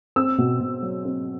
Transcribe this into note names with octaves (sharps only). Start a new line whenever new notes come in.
C4 E6
B2
B2
F#3
C4